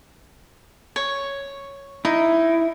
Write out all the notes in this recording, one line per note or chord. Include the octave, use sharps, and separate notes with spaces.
C#5
D#4 E4